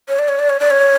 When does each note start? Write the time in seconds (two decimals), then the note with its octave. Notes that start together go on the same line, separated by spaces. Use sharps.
0.09 C#5
0.19 D5
0.28 C#5
0.39 D5
0.50 C#5
0.60 D5
0.70 C#5